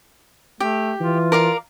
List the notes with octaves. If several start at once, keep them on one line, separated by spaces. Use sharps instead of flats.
A3 G4
E3 F4
A#4 D5 F5